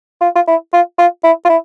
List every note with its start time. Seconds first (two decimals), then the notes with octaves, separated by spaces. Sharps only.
0.21 F4
0.36 F4
0.48 E4
0.73 F4
0.99 F4
1.24 E4
1.45 F4
1.49 E4